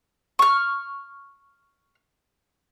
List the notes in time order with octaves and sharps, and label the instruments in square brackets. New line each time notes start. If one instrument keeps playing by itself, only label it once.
[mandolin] C#6 F6